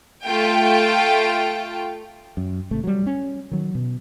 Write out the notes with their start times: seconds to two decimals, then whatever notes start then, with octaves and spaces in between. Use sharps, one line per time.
0.24 A3 F4 G5
2.37 F#2
2.71 G#1 C3 A3
2.84 F#3 G3
3.07 C#4
3.51 D#3 F#3
3.75 B2